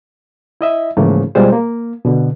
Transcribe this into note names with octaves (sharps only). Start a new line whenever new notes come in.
E4 D#5 E5
G#2 C#3 E3 F3 A3 A#3
B2 G3 G#3 F4 C5
A#3
B2 D3